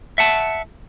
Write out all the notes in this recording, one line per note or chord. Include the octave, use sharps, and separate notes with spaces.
E5 F#5 A5